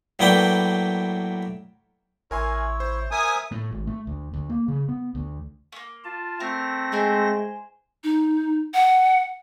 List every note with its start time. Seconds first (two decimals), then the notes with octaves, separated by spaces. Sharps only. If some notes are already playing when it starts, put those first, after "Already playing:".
0.19 A2 F#3 A#3 B4 D5 G5
2.31 A1 E4 A#4 C#5 G#5 C6
2.80 C5
3.12 A#4 E5 G#5 D#6
3.51 A2
3.71 G#1
3.87 A3
4.07 D2
4.33 D2
4.50 A#3
4.68 C#3
4.88 B3
5.15 D2
5.72 A3 A#3
6.04 F4 A5
6.40 A3 C4 A#4 A#6
6.92 G#3 E4 G#4 C5
8.04 D#4
8.73 F#5